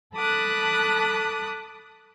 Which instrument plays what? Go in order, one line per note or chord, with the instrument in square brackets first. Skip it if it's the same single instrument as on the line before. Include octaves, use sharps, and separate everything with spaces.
[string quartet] A4 A5 B5 D6 D#6 F#6